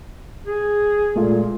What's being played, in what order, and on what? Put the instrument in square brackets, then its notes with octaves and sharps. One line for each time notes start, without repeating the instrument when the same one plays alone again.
[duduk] G#4
[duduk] A#2 [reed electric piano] G#3 A3 F4